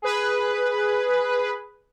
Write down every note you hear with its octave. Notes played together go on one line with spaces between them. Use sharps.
G#4 B4